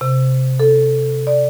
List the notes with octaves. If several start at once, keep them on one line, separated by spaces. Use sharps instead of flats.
C3
A4
D5